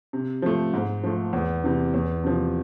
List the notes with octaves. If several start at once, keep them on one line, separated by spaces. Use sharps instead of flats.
C3
F3 A3
G#2
F3 A3
E2
C3 E3
E2
C3 F3